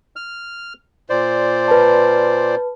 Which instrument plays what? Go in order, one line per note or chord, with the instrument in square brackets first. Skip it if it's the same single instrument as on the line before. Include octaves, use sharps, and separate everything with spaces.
[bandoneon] F6
A#2 C5 D5
[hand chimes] B4 A5